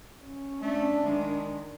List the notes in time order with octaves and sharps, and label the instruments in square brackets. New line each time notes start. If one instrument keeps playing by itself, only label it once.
[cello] C#4
[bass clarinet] A3 [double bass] D4
[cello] D#3 [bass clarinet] G#3